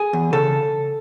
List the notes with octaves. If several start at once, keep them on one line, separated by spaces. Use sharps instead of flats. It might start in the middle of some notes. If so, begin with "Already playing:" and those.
Already playing: G#4
E2
C#3 A4